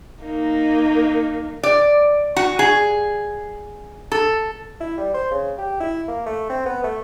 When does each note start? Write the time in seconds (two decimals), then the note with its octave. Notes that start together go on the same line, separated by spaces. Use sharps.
0.24 A#3 D#4
1.63 D5
2.36 F#4
2.59 G#4
4.12 A4
4.81 E4
4.98 G3
5.14 C5
5.31 C#3
5.59 G4
5.80 E4
6.08 A#3
6.26 A3
6.50 C4
6.66 B3
6.84 A3